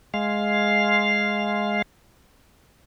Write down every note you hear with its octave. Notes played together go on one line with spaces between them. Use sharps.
G#3 F5